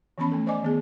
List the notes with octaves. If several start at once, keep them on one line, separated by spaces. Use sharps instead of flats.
E3 F3 B3 C#4 A5 B5
A3 A4
C5 D5 D#5 G#5 D6
D#3 B3 G#4